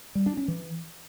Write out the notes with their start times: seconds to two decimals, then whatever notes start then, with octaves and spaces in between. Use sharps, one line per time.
0.15 G3
0.26 D4
0.37 C#4
0.48 E3